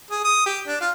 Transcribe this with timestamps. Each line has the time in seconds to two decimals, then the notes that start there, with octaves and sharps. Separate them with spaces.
0.11 G#4
0.25 D#6
0.46 G4
0.67 D4
0.81 F4